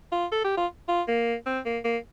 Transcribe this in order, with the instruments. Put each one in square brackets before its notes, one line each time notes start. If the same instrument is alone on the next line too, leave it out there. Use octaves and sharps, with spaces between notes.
[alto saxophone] F4
A4
G4
F4
F4
A#3
C4
A#3
A#3